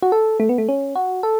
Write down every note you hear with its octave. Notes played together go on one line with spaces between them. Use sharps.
F#4
A4
A3
B3
A3
C#4
F#4
A4